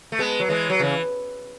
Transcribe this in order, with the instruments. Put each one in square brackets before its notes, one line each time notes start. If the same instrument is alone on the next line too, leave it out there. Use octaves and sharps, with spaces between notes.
[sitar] A3
G#3 B3
F#3
E3 G#3
F#3
C#3 E3